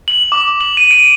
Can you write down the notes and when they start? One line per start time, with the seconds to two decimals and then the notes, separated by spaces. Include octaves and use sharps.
0.08 F#7
0.32 D6
0.61 F#7
0.77 D#7
0.91 D7